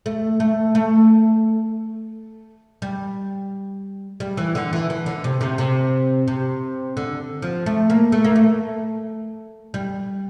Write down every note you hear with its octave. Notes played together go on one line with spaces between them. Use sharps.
A3
A3
A3
G3
G3
E3
D3
E3
E3
D3
C3
C3
C3
C3
D3
F3
A3
A#3
A3
A#3
A3
G3